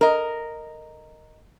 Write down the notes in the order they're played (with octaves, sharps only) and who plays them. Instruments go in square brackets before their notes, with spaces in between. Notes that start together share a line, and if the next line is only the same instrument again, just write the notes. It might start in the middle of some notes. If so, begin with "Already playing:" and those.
[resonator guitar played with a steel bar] A#4 D#5